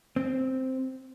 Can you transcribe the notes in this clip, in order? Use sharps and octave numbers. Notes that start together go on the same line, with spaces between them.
C4